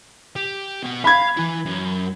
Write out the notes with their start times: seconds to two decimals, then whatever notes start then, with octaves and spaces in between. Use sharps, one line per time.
0.36 G4
0.83 B2 F#5
1.04 E5 F5 B5 G#6
1.37 E3 E4
1.66 F#2